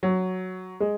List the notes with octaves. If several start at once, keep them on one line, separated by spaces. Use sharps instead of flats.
F#3
G#3